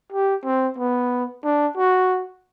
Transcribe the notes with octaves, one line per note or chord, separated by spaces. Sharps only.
G4
C4
B3
D4
F#4